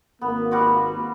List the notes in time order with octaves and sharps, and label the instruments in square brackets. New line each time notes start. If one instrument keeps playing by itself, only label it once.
[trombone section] G#1 A#3 [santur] B3
[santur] G3 F4 F#4